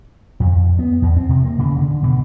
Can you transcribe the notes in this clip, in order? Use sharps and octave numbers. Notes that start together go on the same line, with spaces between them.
F2
B3
E2
C4
C3
A#3
C#3
D3
B2